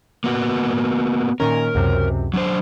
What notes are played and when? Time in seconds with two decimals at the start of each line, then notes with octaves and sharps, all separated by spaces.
0.24 A#3 B3 F#4
1.40 A#2 D#3 C#4 A#4
1.75 C#2 F#2 C3
2.34 F#3 D4 C5